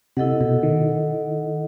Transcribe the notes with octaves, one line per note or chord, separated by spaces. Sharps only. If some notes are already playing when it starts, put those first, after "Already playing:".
C3 E4 A4 D#5 F#5
B2
D#3